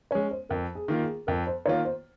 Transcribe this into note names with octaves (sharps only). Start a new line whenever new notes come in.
G#3 C#4 C#5
C5
F2 A#4
G#4
D#3 A#3 F4
G#4
F2 A#4
C5
D#3 A#3 F4 C#5
C5